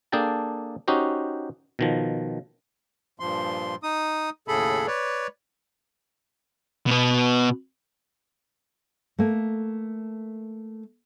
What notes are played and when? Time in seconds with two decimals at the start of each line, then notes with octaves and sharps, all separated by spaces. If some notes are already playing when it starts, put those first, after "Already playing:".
0.12 A#3 D4 G#4 A4 G5 A5
0.88 C#4 D#4 F#4 G4 C5
1.79 B2 D#3 F3
3.20 G2 A#2 F3 C6
3.83 D#4 D#6
4.48 D#2 A2 C#3 G#4 A4 B5
4.87 B4 C#5 D5
6.87 B2 B3
9.19 A3 A#3